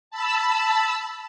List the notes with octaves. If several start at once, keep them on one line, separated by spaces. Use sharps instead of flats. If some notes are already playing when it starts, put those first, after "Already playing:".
A5 B5 E6